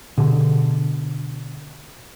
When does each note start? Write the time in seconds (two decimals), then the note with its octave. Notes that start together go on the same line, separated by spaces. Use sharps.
0.18 B2 D3